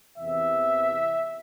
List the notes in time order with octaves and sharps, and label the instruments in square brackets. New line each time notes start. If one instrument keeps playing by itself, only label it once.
[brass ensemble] E2 C3 E3 E5